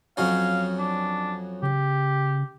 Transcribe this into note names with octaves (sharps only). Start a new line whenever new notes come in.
F2 F#3 C#4 F5
D4
C#3 G4